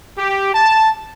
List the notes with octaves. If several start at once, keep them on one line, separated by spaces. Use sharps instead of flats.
G4
A5